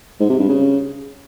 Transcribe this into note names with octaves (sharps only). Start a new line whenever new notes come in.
G#2
C3
G2
C#3